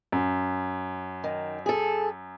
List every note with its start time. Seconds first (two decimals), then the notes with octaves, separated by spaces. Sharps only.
0.12 F#2
1.24 D#3
1.66 G#4 A4